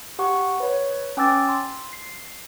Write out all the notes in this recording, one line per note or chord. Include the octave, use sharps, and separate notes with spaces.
G4 F#5 C#6
B4 C#5
C#4 G5 D6 E6 A6
C6
C7